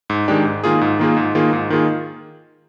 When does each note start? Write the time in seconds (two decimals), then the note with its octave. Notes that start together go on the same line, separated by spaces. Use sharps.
0.10 G#2
0.28 D#3 G#3 D4 G4
0.45 G#2
0.64 D#3 A#3 F4 G#4
0.81 G#2
0.99 D#3 A#3 F4 G#4
1.17 G#2
1.35 D#3 A#3 F4 G#4
1.53 G#2
1.70 D#3 A#3 F4 G#4